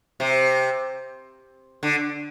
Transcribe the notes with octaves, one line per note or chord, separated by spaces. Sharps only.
C3
D3